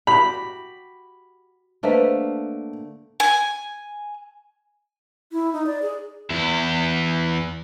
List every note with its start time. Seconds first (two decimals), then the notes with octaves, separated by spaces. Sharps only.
0.07 F#4 G4 F#5 B5
1.83 D3 A3 A#3 B4 C5 D#5
3.20 G#5
5.32 E4
5.53 D#4
5.66 D5
5.82 G#4
6.30 E2 E4